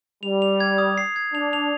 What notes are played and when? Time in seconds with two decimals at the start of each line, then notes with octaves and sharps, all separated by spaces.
0.23 G3 F7
0.42 F7
0.60 G#6
0.78 D#6
0.98 C7
1.16 G#6
1.34 D4 F7
1.53 F7